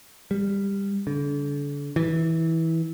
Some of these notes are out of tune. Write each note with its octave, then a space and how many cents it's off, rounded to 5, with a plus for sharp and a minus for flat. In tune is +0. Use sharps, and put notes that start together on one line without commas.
G3 +20
D3 -40
E3 -20